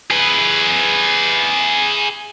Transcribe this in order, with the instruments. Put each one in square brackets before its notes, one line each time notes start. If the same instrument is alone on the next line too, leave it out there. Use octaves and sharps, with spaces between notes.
[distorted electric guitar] G#4 B4